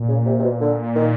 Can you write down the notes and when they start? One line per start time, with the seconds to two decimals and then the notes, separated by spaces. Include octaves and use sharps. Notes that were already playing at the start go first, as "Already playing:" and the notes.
Already playing: A#2
0.09 C#3
0.26 C3
0.39 C3
0.43 B2
0.61 D3
0.96 D#3